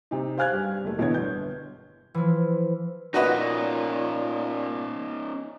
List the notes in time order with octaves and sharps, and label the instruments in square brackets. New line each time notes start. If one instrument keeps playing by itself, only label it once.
[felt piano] C3 D#4
C5 F5 G#5 F6 F#6 G#6
G2 G4
F#1 A3
E1 B2 D3 E4 C#5 G#6
G1 G6
[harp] E3 F3
[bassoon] A#2 [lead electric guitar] C#4 D#4 [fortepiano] F#4 B4 D#5